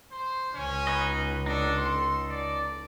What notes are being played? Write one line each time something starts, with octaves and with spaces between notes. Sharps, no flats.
C5
C#2 C#4
D#4 B4 D#5
D4 D#4 A4
C6
D5